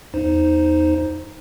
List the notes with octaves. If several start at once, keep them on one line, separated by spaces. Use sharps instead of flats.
E2 D#4 C5